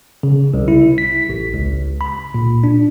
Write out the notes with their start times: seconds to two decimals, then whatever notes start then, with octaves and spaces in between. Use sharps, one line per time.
0.23 C#3
0.54 C2
0.68 E4
0.98 B6
1.29 A1
1.54 C#2
2.01 B5
2.34 A#2
2.64 D4